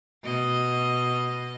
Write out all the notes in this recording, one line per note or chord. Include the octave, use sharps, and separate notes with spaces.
B2 D#5